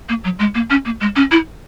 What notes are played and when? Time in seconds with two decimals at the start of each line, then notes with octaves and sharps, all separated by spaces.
0.09 A#3
0.24 F#3
0.39 G#3
0.55 A#3
0.70 C#4
0.85 A#3
1.01 G#3
1.16 C#4
1.31 E4